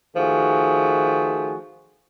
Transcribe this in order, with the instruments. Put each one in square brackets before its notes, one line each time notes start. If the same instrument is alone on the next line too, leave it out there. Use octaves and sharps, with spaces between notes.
[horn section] D#3 F3 A3 F#4 G#4